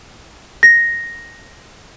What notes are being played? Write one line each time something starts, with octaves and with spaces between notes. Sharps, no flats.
A#6